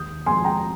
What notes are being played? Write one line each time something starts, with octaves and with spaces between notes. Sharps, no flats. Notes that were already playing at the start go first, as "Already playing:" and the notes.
Already playing: D#2 D#6 G6
F3 G#5 C6
G5 A#5